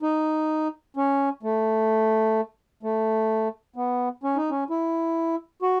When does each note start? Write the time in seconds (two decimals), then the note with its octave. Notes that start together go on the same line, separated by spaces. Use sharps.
0.02 D#4
0.97 C#4
1.43 A3
2.83 A3
3.76 B3
4.23 C#4
4.36 D#4
4.50 C#4
4.70 E4
5.62 F#4